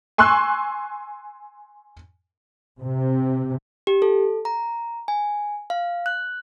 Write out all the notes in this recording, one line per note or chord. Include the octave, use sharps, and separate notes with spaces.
G#5 C6 C#6 E6 F#6
C3
G4
A4
A#5
G#5
F5
F#6